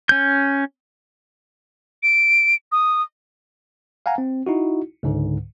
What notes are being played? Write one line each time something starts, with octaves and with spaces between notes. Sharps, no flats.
C#4 G6
D7
D#6
F5 F#5 G#5 A#5
C4
D#4 E4 F#4
C#2 G#2 D3